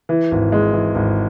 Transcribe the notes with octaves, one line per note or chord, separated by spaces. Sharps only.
E3
G#1
G#3
E3
G#1